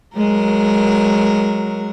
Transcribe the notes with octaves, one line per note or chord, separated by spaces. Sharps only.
F#3 G#3 A#4